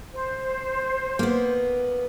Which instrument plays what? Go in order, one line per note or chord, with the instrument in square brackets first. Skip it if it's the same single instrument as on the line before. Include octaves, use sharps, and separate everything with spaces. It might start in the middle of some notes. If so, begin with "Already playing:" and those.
[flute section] C5
[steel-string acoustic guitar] A#3 B3